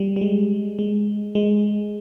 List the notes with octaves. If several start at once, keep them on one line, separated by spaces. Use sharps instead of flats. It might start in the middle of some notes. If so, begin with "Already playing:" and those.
Already playing: G3
G3
G#3
G#3
G#3